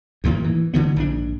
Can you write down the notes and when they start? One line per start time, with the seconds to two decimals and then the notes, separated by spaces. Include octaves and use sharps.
0.24 D2 A2 D#3 A#3
0.44 E3
0.74 D3 D#3 B3
0.96 A#1 G#2 C4 D4